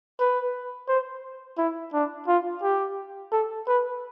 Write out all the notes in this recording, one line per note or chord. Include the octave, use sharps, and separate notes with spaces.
B4
C5
E4
D4
F4
G4
A4
B4